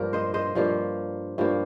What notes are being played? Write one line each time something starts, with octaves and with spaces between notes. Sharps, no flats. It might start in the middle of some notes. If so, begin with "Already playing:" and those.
Already playing: G2 F3 A#3 A#4
C5 D#5
C5 D#5
G2 F3 A#3
G2 F3 A#3